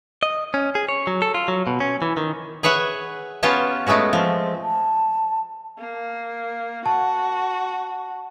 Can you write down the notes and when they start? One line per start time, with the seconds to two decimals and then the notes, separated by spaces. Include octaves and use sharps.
0.23 D#5
0.54 C#4
0.75 G#4
0.89 C#5
1.07 F#3
1.22 A4
1.34 F4
1.48 F#3
1.67 B2
1.80 C#4
2.02 E3
2.17 D#3
2.63 G#4 B4 C#5 E5 F#5
3.43 B3 C#4 F4 G4 C#5 A5
3.86 G#3 A3 B3 C#4 F#4
4.13 F3 C4
4.62 A5
5.78 A#3
6.86 F#4 A5